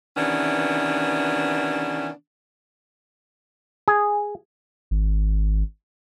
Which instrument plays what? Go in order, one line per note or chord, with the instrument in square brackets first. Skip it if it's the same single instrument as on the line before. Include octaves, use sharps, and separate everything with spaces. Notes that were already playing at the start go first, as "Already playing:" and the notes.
[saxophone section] C3 D#3 E3 B3 C#4 D4
[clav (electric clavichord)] G#4
[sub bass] G#1